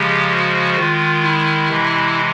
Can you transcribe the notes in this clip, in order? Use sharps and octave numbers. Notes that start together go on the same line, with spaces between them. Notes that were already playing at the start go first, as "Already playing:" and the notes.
Already playing: C#3 F3 G#3 G4
F#4
D#3 G#3 F4
E4
C3 E3 G#3